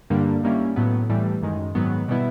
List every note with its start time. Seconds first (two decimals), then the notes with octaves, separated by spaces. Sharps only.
0.10 G2 D3 G3 A#3
0.43 D#3 G3 A#3 C#4 E4
0.76 A2 F#3 B3
1.10 A2 E3 G3
1.42 F#2 D#3 G#3
1.75 G#2 D#3 F#3 B3
2.08 B2 G3 B3 E4